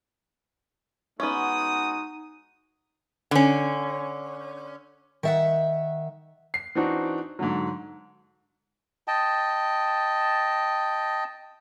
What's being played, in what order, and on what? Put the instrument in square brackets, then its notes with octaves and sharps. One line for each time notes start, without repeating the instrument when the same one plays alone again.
[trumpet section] G#3 F#4 D#6 [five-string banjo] B3 C#4 [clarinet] D#4
[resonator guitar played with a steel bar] D3 C#4
[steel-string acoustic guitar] D#3 E5 F#5
[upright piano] C7
E3 C4 D4 D#4 F#4
G#2 D3 F#3
[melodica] D#5 G5 A5